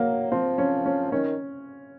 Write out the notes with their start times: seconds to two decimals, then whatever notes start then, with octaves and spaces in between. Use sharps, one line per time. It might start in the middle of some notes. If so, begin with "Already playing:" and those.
Already playing: F#3 A#3
0.32 F3 C4
0.58 C#4
0.86 C#4
1.12 D#3 C#4